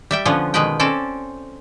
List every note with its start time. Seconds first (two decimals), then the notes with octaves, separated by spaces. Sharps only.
0.11 G3 E5 G5
0.25 D3 F3 B3 C#4 F4
0.54 B2 D#3 G#3 B4 G5
0.80 C4 C#4 A4 D5